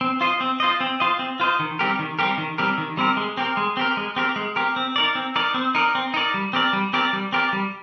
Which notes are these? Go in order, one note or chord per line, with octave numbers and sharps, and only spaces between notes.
C4
F4 C5 D#5
C4
F4 C5 D#5
C4
F4 C5 D#5
C4
F4 C5 D#5
D#3
G3 C4 G4 A#4
D#3
G3 C4 G4 A#4
D#3
G3 C4 G4 A#4
D#3
G3 C4 G4 A#4
G#3
C4 G4 A#4
G#3
C4 G4 A#4
G#3
C4 G4 A#4
G#3
C4 G4 A#4
C4
D#4 A#4 D5
C4
D#4 A#4 D5
C4
D#4 A#4 D5
C4
D#4 A#4 D5
G3
C4 G4 A#4 D5
G3
C4 G4 A#4 D5
G3
C4 G4 A#4 D5
G3